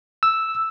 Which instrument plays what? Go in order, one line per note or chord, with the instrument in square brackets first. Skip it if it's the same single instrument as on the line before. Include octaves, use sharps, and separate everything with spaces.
[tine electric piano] E6